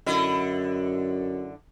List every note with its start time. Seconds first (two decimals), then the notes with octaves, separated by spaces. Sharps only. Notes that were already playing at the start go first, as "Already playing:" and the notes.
0.06 F#2 D3 E4 D#5